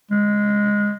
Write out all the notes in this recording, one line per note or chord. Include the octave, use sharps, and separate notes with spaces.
G#3